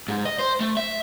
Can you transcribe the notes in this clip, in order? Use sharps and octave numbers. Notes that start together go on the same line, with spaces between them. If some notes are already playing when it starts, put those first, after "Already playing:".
G#2
D#5
C5
A3
E5